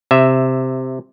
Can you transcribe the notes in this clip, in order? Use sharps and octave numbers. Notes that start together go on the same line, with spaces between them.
C3 E5